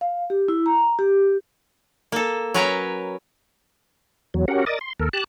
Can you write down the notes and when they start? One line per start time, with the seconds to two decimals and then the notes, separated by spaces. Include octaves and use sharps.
0.01 F5
0.30 G4
0.48 E4
0.66 A#5
0.99 G4
2.12 A#3 A4
2.54 F#3 C#4 A#4 B4 C#5 A#5
4.34 E2 F#3
4.48 C#4 F#4 G4 A#4 F#5
4.66 A#4 D5 D#5 D6 D#6 A6
4.81 C6
5.00 D#2 A4 A#4
5.13 G4 A5 F#6